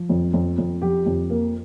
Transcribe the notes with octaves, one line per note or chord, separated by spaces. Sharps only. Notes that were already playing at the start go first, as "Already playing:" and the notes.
Already playing: F3
F2
F2
F2
F3 G4
F2
A#3